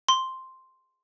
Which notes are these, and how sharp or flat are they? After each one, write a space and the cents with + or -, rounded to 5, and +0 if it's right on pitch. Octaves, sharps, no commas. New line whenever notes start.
C6 +0